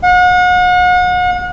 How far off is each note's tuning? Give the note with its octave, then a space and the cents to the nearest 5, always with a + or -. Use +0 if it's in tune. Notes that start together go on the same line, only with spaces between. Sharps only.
F#5 -40